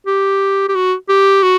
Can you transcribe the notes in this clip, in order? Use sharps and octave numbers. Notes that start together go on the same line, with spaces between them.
G4
G4
F#4
G4
F#4